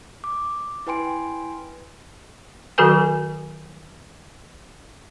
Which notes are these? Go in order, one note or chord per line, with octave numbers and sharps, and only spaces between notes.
D6
E4 B4 G5 G#5 C6 D7
D#3 F#3 F#4 A4 B4 G#5